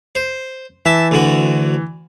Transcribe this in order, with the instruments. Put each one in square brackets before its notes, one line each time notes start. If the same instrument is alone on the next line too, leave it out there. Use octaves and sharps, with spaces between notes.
[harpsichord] C5
[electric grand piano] E3 [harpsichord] E5 A5
[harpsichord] D2 D3 F#4